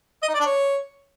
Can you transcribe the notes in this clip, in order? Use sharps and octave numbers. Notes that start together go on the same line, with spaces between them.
D#5
D#4
D5
D4
C#5